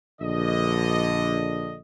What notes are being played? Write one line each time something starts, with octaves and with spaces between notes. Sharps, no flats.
A#1 D3 D#5